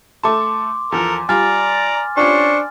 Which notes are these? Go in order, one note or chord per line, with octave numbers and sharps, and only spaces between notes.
A3 A4 A5 C6 D6
E2 F3 A4 A#4
G3 F4 D5 G#5 A#5 F6 A6
C#4 D4 F4 G4 C5 C#6